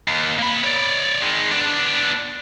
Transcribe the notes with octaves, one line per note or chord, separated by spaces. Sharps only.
D#2
A#3 B5
C#5 D5
D#3 G#3
B3 D4